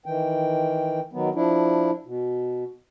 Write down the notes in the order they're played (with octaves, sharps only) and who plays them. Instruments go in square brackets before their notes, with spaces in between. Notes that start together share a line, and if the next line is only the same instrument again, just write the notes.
[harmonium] D#3 E3 G5
D#3 F#3 B3
F3 D4 E4
B2